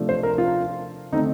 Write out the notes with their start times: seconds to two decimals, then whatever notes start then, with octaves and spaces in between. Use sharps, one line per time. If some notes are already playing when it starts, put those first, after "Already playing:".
Already playing: C3 F3 A3 D4
0.09 C5
0.23 A#4
0.38 F4
1.12 D3 A3 C4 D#4